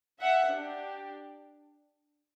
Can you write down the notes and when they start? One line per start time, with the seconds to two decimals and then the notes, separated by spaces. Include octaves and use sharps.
0.21 E5 F#5
0.50 D4 G4